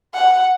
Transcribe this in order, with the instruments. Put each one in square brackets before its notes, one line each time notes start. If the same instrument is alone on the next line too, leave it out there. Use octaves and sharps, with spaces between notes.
[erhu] F#5